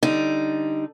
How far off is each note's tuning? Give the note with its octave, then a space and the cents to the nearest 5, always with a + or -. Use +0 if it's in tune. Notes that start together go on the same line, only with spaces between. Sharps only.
D3 +0 G3 +0 D#4 +0